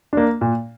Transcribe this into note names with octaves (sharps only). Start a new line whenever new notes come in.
A#3 D4
A#2